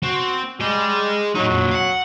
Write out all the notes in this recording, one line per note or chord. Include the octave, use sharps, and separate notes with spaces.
C4 F#4
G3 G#4 D#5
A2 F#3 D#4
F2 A#2
F5 F#5